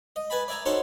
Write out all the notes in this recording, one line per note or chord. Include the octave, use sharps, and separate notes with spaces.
D#5
B4 G#5 A5 B5
D5 E5 G#5 A#5
C#4 D#4 F#4 A4 C5 A5